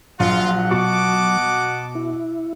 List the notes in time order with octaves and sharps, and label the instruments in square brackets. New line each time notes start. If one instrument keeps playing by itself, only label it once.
[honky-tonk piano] A#1 [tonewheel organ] F#3 [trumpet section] F4 [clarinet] F#5
[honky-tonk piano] B2 C#6 C#7 [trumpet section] D#5 A5 D6
[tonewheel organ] E4